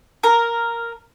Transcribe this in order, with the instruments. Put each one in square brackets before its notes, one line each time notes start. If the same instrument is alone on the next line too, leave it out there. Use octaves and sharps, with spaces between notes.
[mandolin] A#4